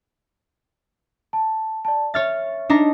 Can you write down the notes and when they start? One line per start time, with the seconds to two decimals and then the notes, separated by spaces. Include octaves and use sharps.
1.33 A5
1.85 D5 A5
2.14 C#5 E5 F6 A6
2.70 D4 D#4 A#5